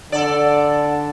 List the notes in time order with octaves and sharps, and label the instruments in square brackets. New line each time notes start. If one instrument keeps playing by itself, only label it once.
[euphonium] D3 [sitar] A4 D5